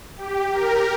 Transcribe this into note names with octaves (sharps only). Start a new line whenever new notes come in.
G4
A#4